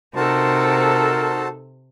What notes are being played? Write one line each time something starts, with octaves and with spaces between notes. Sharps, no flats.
C3 D#4 F#4 A4 A#4 C5 A5